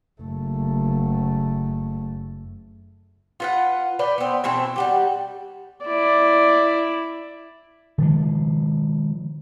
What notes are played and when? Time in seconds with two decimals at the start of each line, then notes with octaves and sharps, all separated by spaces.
0.22 F#1 A3
3.40 F4 B4 F#5
3.99 B4 D5 G5
4.18 B3 C4
4.44 B2 E3 A3 C4
4.76 G3 F#4 G4
5.85 E4 D5
7.98 D#3 F3 G#3